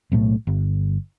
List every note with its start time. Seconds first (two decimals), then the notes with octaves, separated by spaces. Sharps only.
0.12 B1 A2 A3
0.47 G1